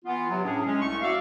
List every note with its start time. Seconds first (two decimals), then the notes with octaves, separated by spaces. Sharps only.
0.05 E3 B3 F4
0.29 C3 F#3
0.43 A2 C3 C#4 D4 G#4
0.65 G#3 C#4
0.82 C2 A3 C#6
1.01 F#4 D5 E5 F5